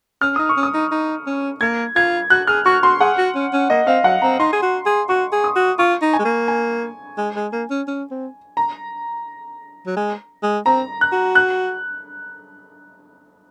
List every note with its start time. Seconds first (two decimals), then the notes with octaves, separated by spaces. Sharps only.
0.21 C#4 F6
0.36 D#4 D#6
0.49 C#6
0.57 C#4
0.63 D#6
0.74 D#4
0.91 D#4
1.26 C#4
1.61 A#3 G#6
1.96 F4 G#6
2.30 F#4 F#6
2.47 G#4 F6
2.66 F#4 C#6
2.83 F#4 C6
3.00 G#4 F#5
3.18 F#4
3.35 C#4
3.53 C#4
3.70 A#3 D#5
3.87 C4 F5
4.04 F#3 F#5
4.22 C4 A#5
4.40 D#4 C6
4.53 G#4
4.62 F#4
4.86 G#4
5.09 F#4 C#6
5.32 G#4
5.44 D#6
5.56 F#4
5.79 F4 C#6
6.02 D#4
6.14 G#5
6.19 G#3
6.25 A#3
6.48 G#5
7.18 G#3
7.35 G#3
7.52 A#3
7.70 C#4
7.88 C#4
8.11 C4
8.57 A#5
9.86 F#3
9.96 G#3
10.43 G#3
10.66 C4 A#5
11.01 F#6
11.12 F#4
11.35 F#6